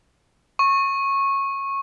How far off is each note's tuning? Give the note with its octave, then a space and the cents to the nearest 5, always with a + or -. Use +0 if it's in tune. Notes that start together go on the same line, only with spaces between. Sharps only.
C#6 -15